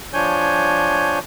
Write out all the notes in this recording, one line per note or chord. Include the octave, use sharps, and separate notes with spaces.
F3 D4 C#5 G#5 G6